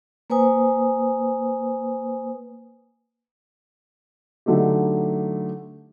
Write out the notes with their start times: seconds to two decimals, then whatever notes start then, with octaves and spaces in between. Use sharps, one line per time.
0.30 A#3 B4 C5 G#5 D#6
4.46 D3 F#3 A3 D#4 G4